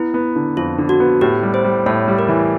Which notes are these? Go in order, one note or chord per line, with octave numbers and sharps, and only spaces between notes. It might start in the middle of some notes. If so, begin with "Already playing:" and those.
Already playing: B3 E4
B3
D3
F2 F4
D3
F#4
B3
A2 G4
G3
C5
G3
A2 C#5
G3
A#4
E3